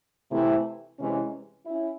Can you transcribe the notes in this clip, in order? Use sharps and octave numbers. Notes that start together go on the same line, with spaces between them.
C3 E3 A3 C4 E4
C3 E3 G#3 C#4
C#4 E4